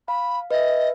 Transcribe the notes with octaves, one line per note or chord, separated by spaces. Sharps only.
F5 B5
B4 D#5 E5